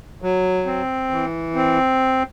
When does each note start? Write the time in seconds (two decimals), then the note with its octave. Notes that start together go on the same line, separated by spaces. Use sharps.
0.22 F#3
0.66 C4
1.11 E3
1.55 C4